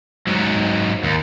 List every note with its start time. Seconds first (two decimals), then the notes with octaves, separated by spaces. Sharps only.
0.27 G#2 F#3
1.04 D#2